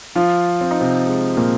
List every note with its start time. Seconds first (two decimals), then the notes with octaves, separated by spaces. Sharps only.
0.16 F3 F4
0.61 C4
0.71 D#4
0.80 C3 C4
1.06 G#3
1.37 A#2 A#3